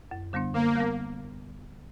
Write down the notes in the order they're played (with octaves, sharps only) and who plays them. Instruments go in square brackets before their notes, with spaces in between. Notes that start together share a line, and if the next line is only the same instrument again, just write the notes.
[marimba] F#2
D3 G3 B3 D4
[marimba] D3 [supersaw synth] A#3
[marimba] G3 B3